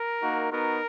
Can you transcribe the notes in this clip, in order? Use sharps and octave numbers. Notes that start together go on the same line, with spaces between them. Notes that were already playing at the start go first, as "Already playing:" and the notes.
Already playing: A#4
A#3 D#4 F#4
B3 D#4 F#4 A#4